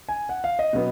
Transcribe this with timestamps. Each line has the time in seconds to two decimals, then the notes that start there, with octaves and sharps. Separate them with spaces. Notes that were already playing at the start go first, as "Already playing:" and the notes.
0.09 G#5
0.29 F#5
0.44 F5
0.59 D#5
0.73 B2 F#3 B3